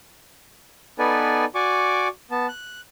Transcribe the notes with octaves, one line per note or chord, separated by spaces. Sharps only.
B3 D#4 A4 B4 D5 G#5
F#4 D5 G#5 C#6 D6
B3 A5
F#6